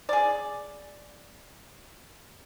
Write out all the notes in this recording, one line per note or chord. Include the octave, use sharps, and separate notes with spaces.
G#4 D5